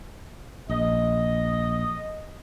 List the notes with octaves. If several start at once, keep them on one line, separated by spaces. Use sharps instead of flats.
A#1 D#5